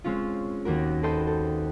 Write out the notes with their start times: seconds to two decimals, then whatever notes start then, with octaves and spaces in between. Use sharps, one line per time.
0.04 G#3 C4 C#4 F4
0.65 D#2 A#3 F#4 A#4
1.03 F#4 A4 B4 C5 D#5 G5
1.27 A4